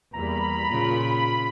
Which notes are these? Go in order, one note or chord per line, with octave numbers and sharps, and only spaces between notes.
E2 G3 A#3 A#5 B5
A#2 C#3 F4